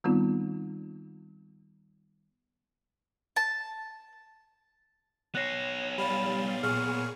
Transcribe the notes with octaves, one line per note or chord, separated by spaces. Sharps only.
D#3 G3 B3 C4 D#4 F4
A5
B3 C#5 F#6 A#6 C7
G3 F5 B5 A6
A#2 G#4 C#6 F6